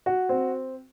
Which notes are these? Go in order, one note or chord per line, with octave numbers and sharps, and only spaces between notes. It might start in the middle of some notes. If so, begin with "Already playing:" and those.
F#4
C4